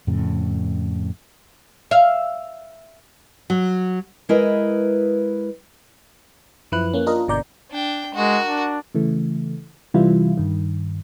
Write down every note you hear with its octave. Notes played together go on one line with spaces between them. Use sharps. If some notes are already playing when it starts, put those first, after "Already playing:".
F2 A2 C#3
E5 F5
F#3
G#3 E4 A#4 B4 D#5
F#2 F3 E4 B4 F#6
A#3 C#4
D4 F4 A#4 D#5
G1 B2 D3 D5 A#5 G6
D4 G5
G#3 F#4 A#4
D4
C#3 E3 A3
C3 E3 G3 E4 F4
G2 D#3